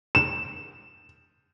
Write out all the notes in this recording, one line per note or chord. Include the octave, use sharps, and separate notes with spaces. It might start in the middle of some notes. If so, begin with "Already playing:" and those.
E7